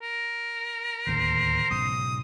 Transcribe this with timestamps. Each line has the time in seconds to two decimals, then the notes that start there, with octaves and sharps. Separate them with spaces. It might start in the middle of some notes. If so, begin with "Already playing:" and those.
0.02 A#4
1.07 D1 D#2 D3 C5
1.71 B1 G#2 C#3 D#6